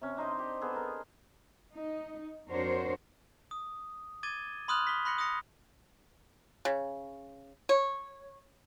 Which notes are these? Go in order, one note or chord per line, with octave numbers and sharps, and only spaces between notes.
C3 C#4
D4 D#4 C5 D#5
G4
B3 G#4 A4
A#4
D#4
F2 D4 F#4 A#4 C5 C#5
D#6
D6 G#6 A6 D#7 G7
B5 C6 D#6 F6 F#6 F7
B6 G7
B5 C6 F#6 A#6 B6 C#7
D#6 F#6 A#6 C#7 F7
C#3
C#5